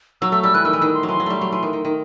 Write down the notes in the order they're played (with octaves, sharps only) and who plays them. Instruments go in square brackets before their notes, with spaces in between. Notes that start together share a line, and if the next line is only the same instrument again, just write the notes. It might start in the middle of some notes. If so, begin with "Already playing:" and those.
[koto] F#3 [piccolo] E6
[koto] A3 [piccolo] E6
[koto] G3 [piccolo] E6
[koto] E3 [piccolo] F#6
[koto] D#3 [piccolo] E6
[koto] E3
[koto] D#3 [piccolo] E6
[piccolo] C6
[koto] F#3
[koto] E3 [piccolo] C6
[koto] F#3
G3 A3
F#3
E3
D#3
D#3
D#3